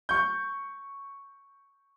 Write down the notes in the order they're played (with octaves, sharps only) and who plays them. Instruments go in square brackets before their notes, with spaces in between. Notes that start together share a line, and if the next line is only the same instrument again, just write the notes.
[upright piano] C#6 G6